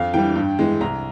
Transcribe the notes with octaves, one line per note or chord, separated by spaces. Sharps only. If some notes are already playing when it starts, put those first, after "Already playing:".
Already playing: F2 F5
E3 G3 G5
G2
E3 G#3
C2 A#5